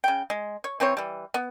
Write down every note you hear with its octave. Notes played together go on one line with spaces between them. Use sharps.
C#3 G5
G#3
C#5
E3 C4 C5 C#5
E3 G3
B3